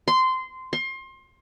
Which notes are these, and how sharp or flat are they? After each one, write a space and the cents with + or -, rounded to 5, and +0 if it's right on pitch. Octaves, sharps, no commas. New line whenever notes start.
C6 -15
C6 +30